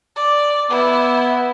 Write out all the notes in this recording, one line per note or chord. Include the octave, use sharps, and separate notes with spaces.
D5
B3 E4